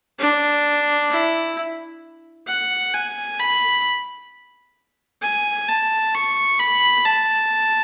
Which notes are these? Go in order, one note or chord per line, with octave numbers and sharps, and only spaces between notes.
D4
E4
F#5
G#5
B5
G#5
A5
C#6
B5
A5